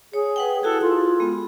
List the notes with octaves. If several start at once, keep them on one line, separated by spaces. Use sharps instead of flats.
G#4 C#5
B4 F#5 G5
E4 F#4 G#4 A4
F4
G#3 B3